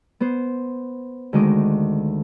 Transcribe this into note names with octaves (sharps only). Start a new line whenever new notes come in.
B3 C5
D2 D#3 G#3 D#5 D6